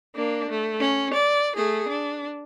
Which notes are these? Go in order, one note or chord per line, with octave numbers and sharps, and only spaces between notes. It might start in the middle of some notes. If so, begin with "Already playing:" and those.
A#3 D4
A3
C#4
D5
A3 G#4
D4